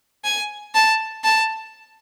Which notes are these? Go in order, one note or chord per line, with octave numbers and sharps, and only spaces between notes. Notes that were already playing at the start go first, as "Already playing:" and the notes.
G#5
A5
A5